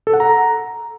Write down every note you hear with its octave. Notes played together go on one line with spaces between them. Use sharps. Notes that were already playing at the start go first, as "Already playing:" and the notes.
A4
F#5
A#5